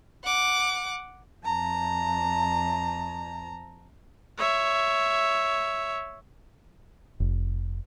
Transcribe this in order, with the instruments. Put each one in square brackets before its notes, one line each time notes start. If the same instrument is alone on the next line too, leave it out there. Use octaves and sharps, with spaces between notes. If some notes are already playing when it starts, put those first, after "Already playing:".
[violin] F#5 D6
[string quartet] F2 A5 A#5
[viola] C#5 E5
[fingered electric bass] F1